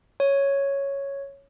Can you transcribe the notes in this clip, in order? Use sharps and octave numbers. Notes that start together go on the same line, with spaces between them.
C#5